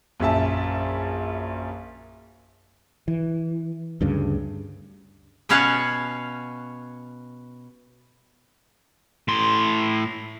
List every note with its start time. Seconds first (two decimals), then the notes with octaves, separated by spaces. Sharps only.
0.20 A#1 F#2 E5 A5
3.08 E3
4.01 D2 G2 C#3
5.49 B2 B3 C#4 C#5 F5 F#5
9.28 A2 C6